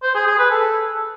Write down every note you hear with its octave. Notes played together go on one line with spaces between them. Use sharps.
C5
G#4
G#4
B4
A4